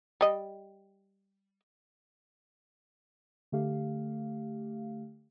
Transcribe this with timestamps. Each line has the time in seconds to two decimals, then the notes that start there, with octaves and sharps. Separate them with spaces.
0.21 G3 D#5
3.52 D3 A3 G4 F5